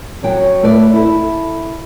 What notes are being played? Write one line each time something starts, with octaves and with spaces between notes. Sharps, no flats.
F#2 F#3 G5
A3 B4 D5
E4 A4